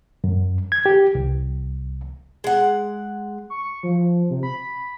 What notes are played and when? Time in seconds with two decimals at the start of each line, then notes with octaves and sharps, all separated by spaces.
0.24 F#2
0.72 G#6
0.86 G4
1.15 C2
2.44 G#3 F#5
3.50 C#6
3.83 F3
4.30 C3
4.43 B5